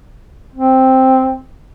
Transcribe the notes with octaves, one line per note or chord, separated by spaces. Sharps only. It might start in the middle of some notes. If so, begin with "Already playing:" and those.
C4